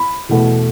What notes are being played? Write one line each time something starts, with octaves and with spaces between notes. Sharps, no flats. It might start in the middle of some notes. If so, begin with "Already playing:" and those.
Already playing: B5
E2 B2 A3